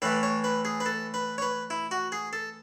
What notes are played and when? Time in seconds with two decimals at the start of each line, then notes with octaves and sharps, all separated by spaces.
0.02 A2 E3 A3 B4
0.23 C#5
0.44 B4
0.65 G#4
0.80 B4
0.86 A4
1.14 B4
1.38 C#5
1.42 B4
1.70 E4
1.91 F#4
2.12 G#4
2.33 A4